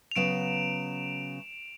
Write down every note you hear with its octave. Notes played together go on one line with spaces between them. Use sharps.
F7
C#3 F#3 B3 D7 E7